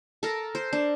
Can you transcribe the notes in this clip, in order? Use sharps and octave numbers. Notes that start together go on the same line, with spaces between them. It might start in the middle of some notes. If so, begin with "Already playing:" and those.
A4 A#4
C5
D4